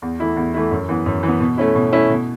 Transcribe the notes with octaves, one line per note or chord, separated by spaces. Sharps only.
E2
E3 A3 E4
E2
E3 A3 E4
F#2
E3 B3
F#2
E3
B3
B2
A3 C#4 E4
B2
A3 C#4 E4
B2